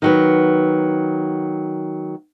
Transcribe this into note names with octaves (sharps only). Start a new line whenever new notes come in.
D#3 F#3 B3